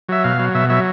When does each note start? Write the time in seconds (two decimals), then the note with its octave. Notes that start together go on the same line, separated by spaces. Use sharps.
0.09 F#3 E5
0.24 B2 F5
0.39 F#3
0.55 B2 E5
0.70 F#3 E5